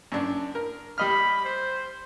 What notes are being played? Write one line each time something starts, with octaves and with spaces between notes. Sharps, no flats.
F#2 D4
A#4
G3 D#5 B5 F6
C5